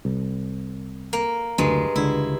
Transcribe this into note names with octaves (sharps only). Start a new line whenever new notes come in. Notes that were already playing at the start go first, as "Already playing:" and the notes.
C2
A#3
F#1 D2 G2 G#3
C#2 D3 E4